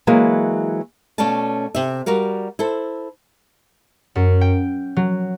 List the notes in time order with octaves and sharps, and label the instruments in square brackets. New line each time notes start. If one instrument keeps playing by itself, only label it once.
[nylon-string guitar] E3 F#3 G#3 A#3
B2 A3 C#4 D5 F5 A5
C3 E5
G3 F#4 A#4 F5
E4 A4 C5
[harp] F#2
G5
F#3